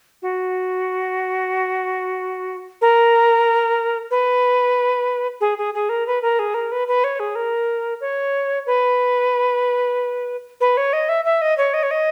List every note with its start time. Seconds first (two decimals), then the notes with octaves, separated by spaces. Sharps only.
0.22 F#4
2.81 A#4
4.11 B4
5.41 G#4
5.58 G#4
5.74 G#4
5.89 A#4
6.07 B4
6.22 A#4
6.39 G#4
6.54 A#4
6.72 B4
6.88 B4
7.04 C#5
7.20 G#4
7.35 A#4
8.01 C#5
8.66 B4
10.61 B4
10.77 C#5
10.93 D#5
11.09 E5
11.25 E5
11.42 D#5
11.58 C#5
11.74 D#5
11.83 C#5
11.91 D#5